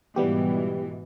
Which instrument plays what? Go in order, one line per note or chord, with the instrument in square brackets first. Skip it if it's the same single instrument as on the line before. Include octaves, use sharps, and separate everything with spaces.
[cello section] G#2 B2 E3 [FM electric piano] G3 B3 G4